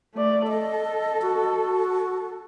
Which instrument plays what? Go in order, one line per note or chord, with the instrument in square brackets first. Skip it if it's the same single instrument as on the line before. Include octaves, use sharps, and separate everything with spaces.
[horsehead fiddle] A3 D5
[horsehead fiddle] A4 [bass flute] D#5
[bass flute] F#4